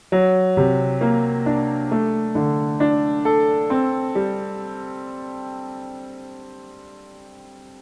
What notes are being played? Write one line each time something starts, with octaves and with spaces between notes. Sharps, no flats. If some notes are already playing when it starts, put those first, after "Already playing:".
F#3
C3
A#3
D4
A3
D3
D4
A4
C4
G3